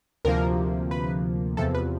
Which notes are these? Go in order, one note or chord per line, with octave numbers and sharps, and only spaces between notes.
D2 C3 F3 A#3 A#4
B4
E2 C3 F3 A4
B4